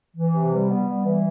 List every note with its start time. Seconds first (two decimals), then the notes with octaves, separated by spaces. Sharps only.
0.16 E3
0.34 C3
0.53 G3
0.70 B3
0.88 G3
1.05 E3